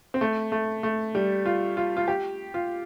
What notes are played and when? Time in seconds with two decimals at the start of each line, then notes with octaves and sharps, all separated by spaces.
0.14 C4
0.21 A3
0.52 A3
0.83 A3
1.15 G3
1.46 F4
1.77 F4
1.97 F4
2.08 G4
2.54 F4